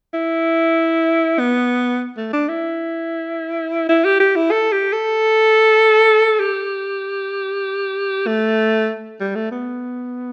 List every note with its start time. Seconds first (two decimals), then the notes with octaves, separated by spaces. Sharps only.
0.14 E4
1.39 B3
2.17 A3
2.33 D4
2.49 E4
3.89 E4
4.05 G4
4.20 G4
4.36 E4
4.51 A4
4.72 G4
4.93 A4
6.40 G4
8.26 A3
9.20 G3
9.35 A3
9.51 B3